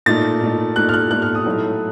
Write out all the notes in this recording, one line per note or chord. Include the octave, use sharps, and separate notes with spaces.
A#2 A3 D#4 A6
A#2 A3 D#4
A#2 A3 D#4 F#6
F6
F#6
A#2 A3 D#4 F#6
F6
D#6
A2 F#3 A3 D#4